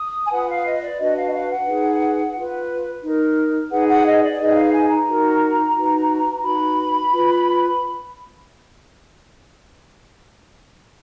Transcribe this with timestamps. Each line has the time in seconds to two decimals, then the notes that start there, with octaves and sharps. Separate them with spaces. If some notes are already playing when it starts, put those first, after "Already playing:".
Already playing: D#6
0.26 G#5
0.30 F4 B4 F#5
0.48 F5
0.65 D#5
0.81 D5
0.99 D4 F#4 B4 D#5
1.15 F5
1.27 D#5
1.33 F5
1.50 F#5
1.66 D#4 G#4 B4
2.34 F4 B4
3.03 D#4 A#4
3.70 D#4 G#4 B4 F#5
3.88 F#5
4.05 D#5
4.21 D5
4.39 D#4 G#4 B4 D#5
4.51 F#5
4.55 F5
4.73 G#5
4.90 A#5
5.07 D#4 F#4 A#4
5.75 D#4 F#4 B4
6.43 D#4 F#4 B4 B5
7.11 F4 B4